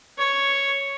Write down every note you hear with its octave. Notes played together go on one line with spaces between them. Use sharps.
C#5